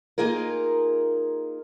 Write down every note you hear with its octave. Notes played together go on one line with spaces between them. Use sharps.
A#3 D#4 F4 G#4 A#4